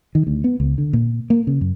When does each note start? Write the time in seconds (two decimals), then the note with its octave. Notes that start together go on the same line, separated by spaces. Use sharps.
0.15 D#3
0.27 D2
0.44 B3
0.60 C#2
0.78 D3
0.93 A#2
1.30 A#3
1.47 C#3
1.61 F#2